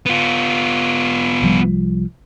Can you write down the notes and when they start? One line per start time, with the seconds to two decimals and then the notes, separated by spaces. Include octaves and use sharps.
0.06 B3 F4
1.42 C2 F3 G3